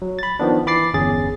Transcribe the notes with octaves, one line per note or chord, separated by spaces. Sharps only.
F#3
B5 A6
D#3 F3 B3 D4
E3 B5 D6 A6 C7
G1 E2 C#4 G#4 A6